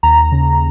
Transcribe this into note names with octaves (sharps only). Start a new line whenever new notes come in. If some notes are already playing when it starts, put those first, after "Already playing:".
D#2 A#5
C#3